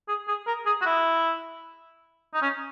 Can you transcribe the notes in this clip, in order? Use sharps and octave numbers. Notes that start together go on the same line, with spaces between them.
G#4
G#4
A#4
G#4
F#4
E4
D#4
C#4